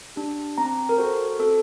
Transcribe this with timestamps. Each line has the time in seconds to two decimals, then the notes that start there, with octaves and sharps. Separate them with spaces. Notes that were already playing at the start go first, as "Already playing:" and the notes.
0.16 D4 G4
0.58 C4 A#5
0.89 A#4
0.98 F#4 A4 C5
1.39 C4 A4